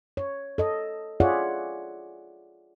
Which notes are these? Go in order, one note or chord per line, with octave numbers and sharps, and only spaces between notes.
C#5
A4 D#5
F4 G#4 C#5 D5 E5 F#5